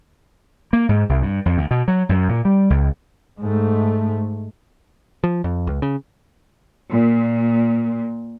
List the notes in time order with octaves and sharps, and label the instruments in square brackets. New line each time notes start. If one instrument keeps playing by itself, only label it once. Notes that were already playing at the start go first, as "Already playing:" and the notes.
[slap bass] A#3
G#2
C2
G2
F2
D2
B2
F#3
F#2
A#2
G3
C#2
[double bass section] G#2 A3
[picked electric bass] F3
F2
C#2
C#3
[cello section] A#2